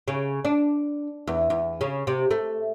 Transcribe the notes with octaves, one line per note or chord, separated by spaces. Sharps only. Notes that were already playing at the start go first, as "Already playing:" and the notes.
C#3
D4
E2
E2
C#3
C3
A3